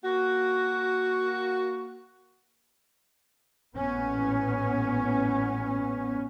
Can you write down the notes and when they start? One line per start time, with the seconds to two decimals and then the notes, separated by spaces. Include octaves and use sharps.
0.04 A#3 F#4
3.75 A1 A#2 B3 C#4